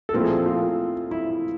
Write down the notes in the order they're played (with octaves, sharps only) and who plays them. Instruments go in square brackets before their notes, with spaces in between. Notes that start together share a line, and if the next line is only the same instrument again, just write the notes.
[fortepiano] A4
A#2 F3 A3 C4 E4 A#4
G#4
F4
E4